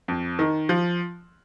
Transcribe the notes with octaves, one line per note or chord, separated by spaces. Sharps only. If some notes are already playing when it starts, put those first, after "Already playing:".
F2
D#3
F3